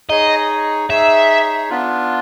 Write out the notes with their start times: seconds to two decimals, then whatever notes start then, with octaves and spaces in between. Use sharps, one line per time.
0.10 D#4 G#4 C#5 D#5
0.90 D#4 G#4 C#5 E5
1.70 B3 D4 F4